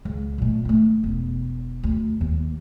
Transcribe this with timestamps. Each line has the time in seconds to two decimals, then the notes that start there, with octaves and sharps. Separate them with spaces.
0.05 C#2
0.38 A#2 A3
0.65 A3 D#4
1.03 E1 D#4
1.83 D2
2.21 D#2